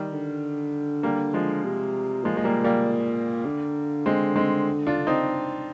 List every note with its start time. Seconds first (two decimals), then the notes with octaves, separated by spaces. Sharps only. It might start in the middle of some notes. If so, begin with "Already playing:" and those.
Already playing: D#3 G3
0.13 D3
1.03 G3 A#3
1.34 F3 G#3
1.64 C3
2.24 A#2 F3 G#3
2.37 G#3
2.44 G3 A#3
2.64 G3 A#3
3.46 D3
4.06 G#3 C4
4.36 G#3 C4
4.87 D4 F4
5.07 C4 D#4